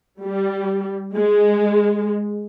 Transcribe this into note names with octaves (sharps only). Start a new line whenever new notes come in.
G3
G#3